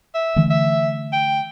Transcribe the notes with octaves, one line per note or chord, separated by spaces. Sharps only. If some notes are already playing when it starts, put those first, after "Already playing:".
E5
D3 E3 A3
E5
G5